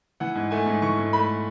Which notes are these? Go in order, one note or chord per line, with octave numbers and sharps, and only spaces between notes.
E3 F#5
G#2
A3 G#5
G#2
E3 C#6
G#2
A3 B5